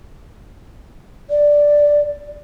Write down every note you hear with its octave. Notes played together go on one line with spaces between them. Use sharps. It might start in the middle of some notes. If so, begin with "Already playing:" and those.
D5